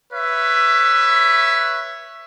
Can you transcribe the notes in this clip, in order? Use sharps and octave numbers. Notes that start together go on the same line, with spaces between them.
B4 C#5 E5